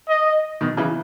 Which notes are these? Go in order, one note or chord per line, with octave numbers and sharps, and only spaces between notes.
D#5
B2 D#3
C#3 E3